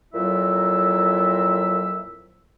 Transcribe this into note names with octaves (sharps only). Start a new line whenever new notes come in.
F2 A#2 F#3 E4 E5